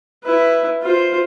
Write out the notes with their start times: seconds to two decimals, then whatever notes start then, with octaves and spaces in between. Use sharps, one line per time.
0.23 E4 B4
0.82 F4 C5